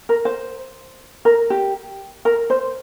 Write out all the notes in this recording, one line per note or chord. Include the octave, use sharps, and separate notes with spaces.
A#4
C5
A#4
G4
A#4
C5